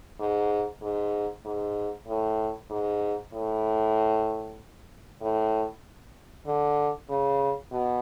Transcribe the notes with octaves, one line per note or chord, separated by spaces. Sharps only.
G#2
G#2
G#2
A2
G#2
A2
A2
D3
C#3
B2